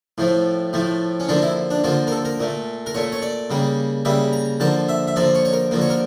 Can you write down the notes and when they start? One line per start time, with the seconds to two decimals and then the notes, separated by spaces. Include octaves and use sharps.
0.18 A2 F3 A3
0.73 A2 F3 A3
1.20 C#4
1.29 D3 F3 A#3 D4
1.42 E4
1.71 D4
1.84 D3 F3 A#3 F4
2.07 A#4
2.12 A4
2.25 A#4
2.40 A#2 A3
2.86 A#4
2.94 A#2 A3 C#5
3.12 C#5
3.22 D5
3.50 C#3 G3 A#3
4.05 C#3 G3 A#3 E5
4.33 A#5
4.60 D3 F3 A#3 A5
4.89 E5
5.08 E5
5.16 D3 F3 A#3 D5
5.35 C#5
5.45 C#5
5.53 A#4
5.71 D3 F3 A#3
5.81 C#5
5.90 A#4